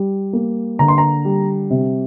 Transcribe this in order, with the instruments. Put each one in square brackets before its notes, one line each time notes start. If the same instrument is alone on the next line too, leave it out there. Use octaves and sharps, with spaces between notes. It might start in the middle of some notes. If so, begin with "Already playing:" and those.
Already playing: [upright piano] G3
A#3
D3 A#5
C6
A#5
G3
C3